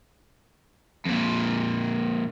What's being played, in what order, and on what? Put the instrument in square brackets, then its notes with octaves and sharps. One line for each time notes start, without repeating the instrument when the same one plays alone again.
[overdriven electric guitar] F2 A#2